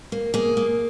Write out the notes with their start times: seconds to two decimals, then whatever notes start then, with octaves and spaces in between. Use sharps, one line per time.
0.12 A#3
0.34 A#3 G#4
0.57 A#3